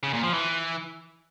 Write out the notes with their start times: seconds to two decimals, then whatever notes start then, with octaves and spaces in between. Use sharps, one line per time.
0.03 C#3
0.13 A#2
0.23 F3
0.34 E3